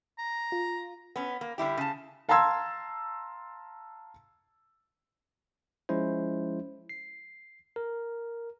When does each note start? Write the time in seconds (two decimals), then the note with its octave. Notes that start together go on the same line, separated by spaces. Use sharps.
0.18 A#5
0.52 F4
1.16 B3 C#4
1.41 A#3
1.58 D3 G3 E4 G4
1.78 C#3 A5
2.29 F5 A5 A#5 C6 E6 G#6
5.89 F3 G#3 C#4 E4 C5
6.89 C7
7.76 A#4